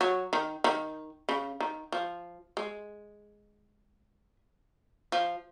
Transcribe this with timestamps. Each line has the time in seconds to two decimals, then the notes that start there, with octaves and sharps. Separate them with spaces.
0.01 F#3
0.33 D#3
0.64 D#3
1.29 C#3
1.60 D#3
1.92 F3
2.57 G#3
5.12 F3